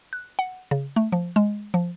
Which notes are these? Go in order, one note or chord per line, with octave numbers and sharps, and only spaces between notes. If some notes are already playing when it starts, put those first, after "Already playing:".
F#6
F#5
C#3
A3
F3
G#3
F3